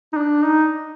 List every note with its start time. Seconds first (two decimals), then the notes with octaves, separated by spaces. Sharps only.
0.13 D#4
0.17 D4
0.44 D#4